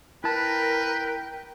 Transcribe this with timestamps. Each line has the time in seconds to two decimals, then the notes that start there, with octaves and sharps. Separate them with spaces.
0.24 E4 A#4 B4 G5 A5